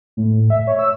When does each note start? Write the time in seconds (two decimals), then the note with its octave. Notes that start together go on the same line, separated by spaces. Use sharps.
0.17 A2
0.50 E5
0.67 C#5
0.79 E6